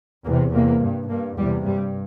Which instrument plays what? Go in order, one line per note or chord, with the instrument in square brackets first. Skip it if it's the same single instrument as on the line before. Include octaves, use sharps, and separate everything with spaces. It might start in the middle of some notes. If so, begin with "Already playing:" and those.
[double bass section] E2 A#3
C3
E2 C3 A#3
G2
G2 A#3
E2 G3
C3
G2 G3